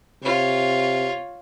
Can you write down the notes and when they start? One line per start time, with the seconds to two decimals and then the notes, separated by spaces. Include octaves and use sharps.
0.23 C3 F4 C#5